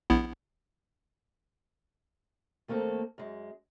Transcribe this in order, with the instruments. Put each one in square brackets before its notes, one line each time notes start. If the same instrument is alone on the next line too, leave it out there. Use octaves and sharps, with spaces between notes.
[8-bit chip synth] A#1 B3 E4
[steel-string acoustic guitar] D#2 A3 A#3 C4 A4
F#2 G#3